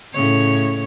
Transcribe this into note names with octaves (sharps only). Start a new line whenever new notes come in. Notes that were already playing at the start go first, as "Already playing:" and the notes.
A2 C#3 C#5